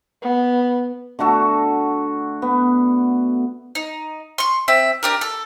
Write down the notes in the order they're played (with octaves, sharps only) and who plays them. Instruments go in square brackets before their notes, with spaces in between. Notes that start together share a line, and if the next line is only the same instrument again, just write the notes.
[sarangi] B3
[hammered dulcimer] D3 A3 F#4 A4
B3
[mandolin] D#4
C6 C#6
C4 E5
D4 G4 A#4
A4